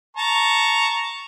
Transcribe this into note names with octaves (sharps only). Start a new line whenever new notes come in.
A5 A#5 C#6